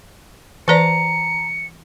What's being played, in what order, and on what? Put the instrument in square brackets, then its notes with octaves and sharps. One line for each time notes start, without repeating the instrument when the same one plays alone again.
[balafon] E3 B4 D5 [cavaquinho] A5 A#5 [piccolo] C#7